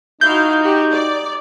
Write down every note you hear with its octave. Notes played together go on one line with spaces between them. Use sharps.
D#4 E4 F#4 F5 G6
F#4 G4
D5